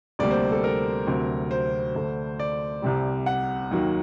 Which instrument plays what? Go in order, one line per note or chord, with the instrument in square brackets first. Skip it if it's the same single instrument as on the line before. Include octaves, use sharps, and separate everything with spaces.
[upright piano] D2 C3 G3 A#3 D5
C5
A4
A#4
D2 C3 F#3 C4
C5
D2 D3 A3
D5
C2 C3 G3
F#5
D#2 D#3 F#3 A#3